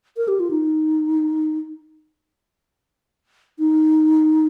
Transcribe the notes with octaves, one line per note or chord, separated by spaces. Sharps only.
A#4
G4
F4
D#4
D#4